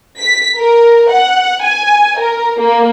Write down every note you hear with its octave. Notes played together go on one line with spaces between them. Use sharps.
B6
A#4
F#5
G#5
A#4
A#3